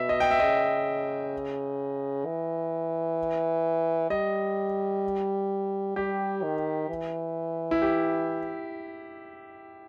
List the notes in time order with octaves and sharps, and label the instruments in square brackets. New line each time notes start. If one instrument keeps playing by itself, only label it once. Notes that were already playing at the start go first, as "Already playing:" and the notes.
Already playing: [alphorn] B2 [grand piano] E5
[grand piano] D#5
G5
E5
[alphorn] C#3 [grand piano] D#5
[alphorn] E3
[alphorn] G3 [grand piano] D#5
[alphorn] G3 [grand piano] G4
[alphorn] D#3
E3
[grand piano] E4
G4